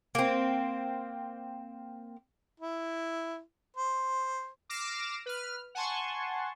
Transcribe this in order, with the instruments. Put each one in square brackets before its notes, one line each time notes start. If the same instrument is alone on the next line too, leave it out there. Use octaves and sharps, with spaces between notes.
[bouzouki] A#3 C4
[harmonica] E4
C5
[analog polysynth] D6 F6 A#6 C7 D7 E7
B4 F6
F#5 G#5 A5 C6 C#6